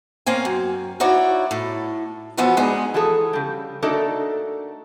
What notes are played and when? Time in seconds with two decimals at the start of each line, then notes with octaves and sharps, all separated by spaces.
0.26 A#3 C4 C#4 G#5
0.45 F#2
1.00 D#4 E4 F#4 C#5 D5
1.51 A2 A4
2.37 E3 F3 B3 F#4 A4 B4
2.57 G#3 B3 D4 D#4 G#4
2.94 E3 F3 F#4 G#4 A4
3.33 C#3 G3
3.83 A3 A#3 D4 D#4 F#4 A4